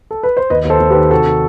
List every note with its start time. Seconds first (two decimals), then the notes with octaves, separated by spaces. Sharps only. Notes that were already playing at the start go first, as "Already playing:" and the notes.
0.11 A4
0.23 B4
0.37 C5
0.50 D#2 B4 D#5
0.65 D#2
0.70 A4 C5
0.80 D#2
0.91 G4 B4
0.95 D#3
1.11 C3 F#4 A4
1.27 D#3